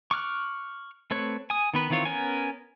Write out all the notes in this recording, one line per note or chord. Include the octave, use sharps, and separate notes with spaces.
C#6 D6 F6 F#6
A3 C4 B4 C#5
G#5 D#6
D#3 B3 B4
D#3 E3 C4 F4 C#5
B3 C#4 A#4 G#5